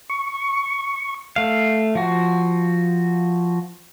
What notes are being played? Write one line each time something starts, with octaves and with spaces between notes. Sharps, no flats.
C#6
A3 F5
F3 F#4